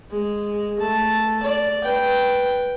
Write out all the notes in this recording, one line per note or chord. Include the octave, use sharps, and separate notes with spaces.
G#3
A3 A5
D5
B4 G5